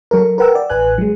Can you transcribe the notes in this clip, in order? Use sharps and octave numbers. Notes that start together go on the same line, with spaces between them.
F#3 A4 A#4
A#4 B4 F#5 G5 E6
D5
A1 B4 G#5 F#6
F#3 G#3